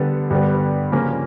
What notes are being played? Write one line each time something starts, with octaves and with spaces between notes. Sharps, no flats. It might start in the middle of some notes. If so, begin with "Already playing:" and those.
Already playing: D3 G3 B3 A4
G2 D3 G3 B3
C#3 F3 A#3 C#4 F4